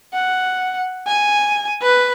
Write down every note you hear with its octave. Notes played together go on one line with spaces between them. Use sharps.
F#5
G#5
B4